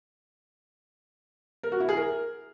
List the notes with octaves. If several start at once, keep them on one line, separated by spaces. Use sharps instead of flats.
A#4
F#4
E4
G#4
A#4